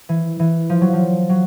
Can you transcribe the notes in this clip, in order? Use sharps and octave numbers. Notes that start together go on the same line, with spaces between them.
E3
E3
F3
F#3
F3
F#3